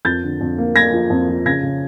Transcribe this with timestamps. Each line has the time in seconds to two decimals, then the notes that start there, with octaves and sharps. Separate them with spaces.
0.05 F2 G6 A6
0.23 D3
0.41 F2
0.58 A#3
0.75 A#3 G#6 A#6
0.92 F3
1.10 F2
1.29 F3
1.46 C#3 G#6 A#6
1.63 C#3